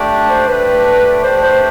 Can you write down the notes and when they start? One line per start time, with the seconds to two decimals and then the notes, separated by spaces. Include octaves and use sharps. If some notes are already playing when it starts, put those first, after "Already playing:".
Already playing: A3 D4 G4 D5
0.29 C5
0.48 A3 D4 G4 B4 D5
1.24 A3 D4 G4 C5 D5
1.43 C5